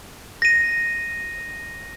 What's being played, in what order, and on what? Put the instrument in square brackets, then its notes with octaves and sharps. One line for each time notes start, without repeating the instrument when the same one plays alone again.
[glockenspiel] A#6 D#7